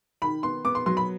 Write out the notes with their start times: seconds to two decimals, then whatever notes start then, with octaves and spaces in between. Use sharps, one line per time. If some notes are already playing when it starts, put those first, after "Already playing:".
0.22 D#3 B5
0.43 B3 C6
0.65 B3 D6
0.75 C6
0.86 F#3 C6
0.97 B5